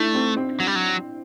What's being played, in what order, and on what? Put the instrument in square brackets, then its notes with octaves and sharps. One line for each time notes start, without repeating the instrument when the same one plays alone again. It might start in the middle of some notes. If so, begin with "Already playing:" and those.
Already playing: [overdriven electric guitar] A3 [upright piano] D4 E4
[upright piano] C4
C4
[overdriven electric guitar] F#3
G3
F#3